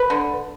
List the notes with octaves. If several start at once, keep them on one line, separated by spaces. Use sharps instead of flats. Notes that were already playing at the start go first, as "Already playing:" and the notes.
Already playing: B4
D3